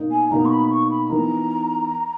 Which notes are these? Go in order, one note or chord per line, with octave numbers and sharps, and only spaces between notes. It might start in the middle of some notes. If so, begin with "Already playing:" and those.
Already playing: B2 A#3 D#4
G#5
B2 A#3 D#4 A#5
C#6
B5
C#6
B5
E3 B3 D#4 A#4 A#5